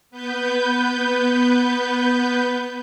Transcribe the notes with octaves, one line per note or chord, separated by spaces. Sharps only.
B3 B4 G6